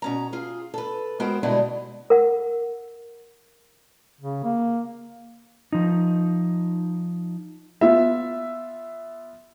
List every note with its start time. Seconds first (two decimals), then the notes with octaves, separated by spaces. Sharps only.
0.02 B2 C#4 A#5
0.33 F4 G#4
0.74 A4 B4
1.20 G#3 B3 F#4 A#4 C5 G5
1.43 B2 D3 G3 G#3 D#4 E4
2.10 A#4 F#5
4.21 C#3
4.44 A#3
5.73 F3 D#4
7.81 B3 F4 E5